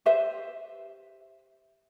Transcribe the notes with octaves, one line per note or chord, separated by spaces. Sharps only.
G4 B4 C5 E5